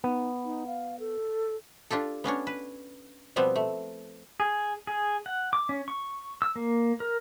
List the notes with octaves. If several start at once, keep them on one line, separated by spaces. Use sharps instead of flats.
B3 D#4
D#4
F5
A4
D4 F4 G4 A4
B3 C#4 D4 C#5
B4
B2 F3 G3 B3 C4
A3
G#4
G#4
F#5
D6
C#4
C#6
E6
A#3
A#4